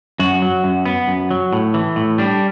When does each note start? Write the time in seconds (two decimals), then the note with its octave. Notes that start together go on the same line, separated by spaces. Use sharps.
0.19 F#2 F#4
0.42 F#3
0.64 F#2
0.86 B3
1.08 F#2
1.31 F#3
1.53 A2
1.74 E3
1.96 A2
2.18 G3 D4